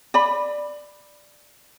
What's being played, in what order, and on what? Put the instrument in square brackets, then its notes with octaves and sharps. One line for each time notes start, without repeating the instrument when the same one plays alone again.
[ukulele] D5 B5